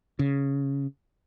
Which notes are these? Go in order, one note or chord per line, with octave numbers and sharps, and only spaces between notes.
C#3